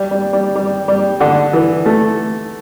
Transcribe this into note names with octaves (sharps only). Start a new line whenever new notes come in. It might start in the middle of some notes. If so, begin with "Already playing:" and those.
Already playing: G3
G3
G3
G3
G3
D3
E3
A3